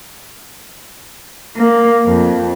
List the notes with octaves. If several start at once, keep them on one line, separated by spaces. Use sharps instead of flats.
A#3
F2